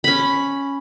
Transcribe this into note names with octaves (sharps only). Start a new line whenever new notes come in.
C#4 B5